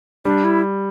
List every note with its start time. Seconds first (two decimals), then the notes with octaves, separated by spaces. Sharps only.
0.25 G3 D4
0.44 E4